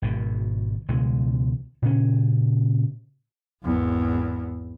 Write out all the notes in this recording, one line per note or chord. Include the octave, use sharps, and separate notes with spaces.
G#1 B2
C#2 B2 E3 G#3
A#2 C#3 C#4
G#1 E2